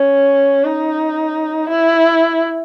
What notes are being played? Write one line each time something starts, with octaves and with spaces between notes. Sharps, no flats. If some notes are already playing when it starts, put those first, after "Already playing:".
Already playing: C#4
D#4
E4